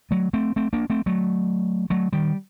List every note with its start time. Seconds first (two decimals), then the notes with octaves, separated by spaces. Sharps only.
0.11 F#3 A3
0.33 A3 C4
0.56 A3 C4
0.73 A#3 D4
0.90 A3 C4
1.06 F#3 A3
1.90 F#3 A3
2.13 D#3 G3